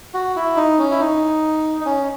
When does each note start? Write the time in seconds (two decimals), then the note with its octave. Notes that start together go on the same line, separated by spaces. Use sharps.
0.14 F#4
0.36 E4
0.56 D#4
0.79 C#4
0.91 E4
1.00 D#4
1.80 D#4
1.86 C#4